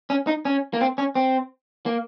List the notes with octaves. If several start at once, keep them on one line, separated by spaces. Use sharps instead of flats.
C#4
D#4
C#4
A#3
C4
C#4
C4
A#3